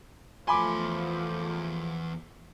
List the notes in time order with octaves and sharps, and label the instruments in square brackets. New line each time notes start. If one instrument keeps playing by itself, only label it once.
[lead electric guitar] E2 C6 [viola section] F3 A3 [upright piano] G#5 B5 D6